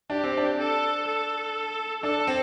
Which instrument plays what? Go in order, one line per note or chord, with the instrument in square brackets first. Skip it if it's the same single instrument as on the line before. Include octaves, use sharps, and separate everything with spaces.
[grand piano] D4 [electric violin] G4
[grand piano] C4
D4
[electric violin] A4
A4
[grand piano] D4 [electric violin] A4
[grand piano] C4